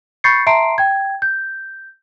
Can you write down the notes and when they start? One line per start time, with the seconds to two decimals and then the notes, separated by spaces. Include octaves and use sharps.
0.24 B5 C#6 G6 A6 C7 C#7
0.47 E5 A5 A#5 C6 C7 D7
0.78 G5 G#6
1.22 G6